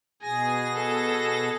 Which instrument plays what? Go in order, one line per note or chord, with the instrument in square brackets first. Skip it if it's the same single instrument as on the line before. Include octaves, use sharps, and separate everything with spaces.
[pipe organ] B2 G#4 A#6 [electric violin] G#5
[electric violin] A4